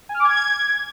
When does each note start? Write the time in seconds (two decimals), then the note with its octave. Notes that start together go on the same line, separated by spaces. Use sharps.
0.09 G#5
0.14 F6
0.20 D6
0.25 G#6